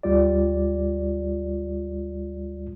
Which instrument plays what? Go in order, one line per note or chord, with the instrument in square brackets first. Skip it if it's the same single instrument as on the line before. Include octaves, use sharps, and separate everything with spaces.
[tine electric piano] D2 G3 F4 D5